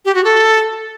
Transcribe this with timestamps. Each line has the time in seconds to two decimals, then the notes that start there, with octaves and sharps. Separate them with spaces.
0.05 G4
0.15 F#4
0.24 A4